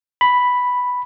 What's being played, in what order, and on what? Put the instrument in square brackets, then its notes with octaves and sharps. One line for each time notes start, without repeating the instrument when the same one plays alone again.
[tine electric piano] B5